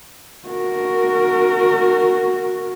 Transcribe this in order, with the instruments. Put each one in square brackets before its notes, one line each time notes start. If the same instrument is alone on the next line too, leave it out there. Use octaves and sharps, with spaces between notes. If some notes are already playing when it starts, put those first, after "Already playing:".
[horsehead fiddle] F#4 A#4